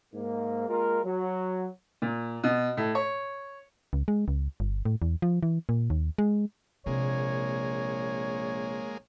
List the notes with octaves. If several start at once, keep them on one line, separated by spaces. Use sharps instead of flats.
G#2 A#3
G#3 A#3 F4 A#4
F#3
A#2
B2
A2
C#5
C#2
G#3
C#2
G1
A2
E2
F3
E3
A#2
D#2
G#3
A#1 C3 G#3 A#3 C#5